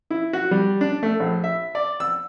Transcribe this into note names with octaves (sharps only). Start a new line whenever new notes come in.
E4
F#4
G3
D4
A3
A#1
E5
D5
E6